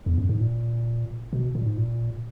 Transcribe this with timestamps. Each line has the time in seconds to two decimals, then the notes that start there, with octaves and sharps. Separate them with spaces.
0.06 E2
0.18 F#2
0.29 G#2
0.40 A#2
1.33 B2
1.55 A#2
1.66 G#2
1.77 A#2